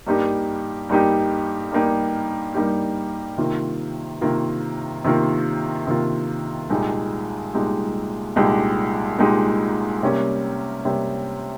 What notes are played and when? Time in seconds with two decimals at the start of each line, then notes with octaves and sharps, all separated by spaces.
0.07 G2 G3 A#3 D#4 G4
0.90 G2 G3 A#3 D#4 G4
1.72 G2 G3 A#3 D#4 G4
2.55 G2 G3 A#3 D#4 G4
3.38 C3 D#3 A#3 F4
4.21 C3 D#3 A#3 F4
5.04 C3 D#3 A#3 F4
5.87 C3 D#3 A#3 F4
6.70 C2 A#2 G#3 D#4 G4
7.54 C2 A#2 G#3 D#4 G4
8.36 C2 A#2 G#3 D#4 G4
9.19 C2 A#2 G#3 D#4 G4
10.02 C3 G3 A#3 C#4 G4
10.85 C3 G3 A#3 C#4 G4